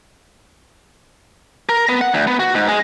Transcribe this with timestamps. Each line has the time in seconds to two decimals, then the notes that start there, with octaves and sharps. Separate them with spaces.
1.69 A#4
1.89 B3
2.01 F#5
2.14 D2
2.27 B3
2.40 F#4
2.55 G#2
2.68 G#3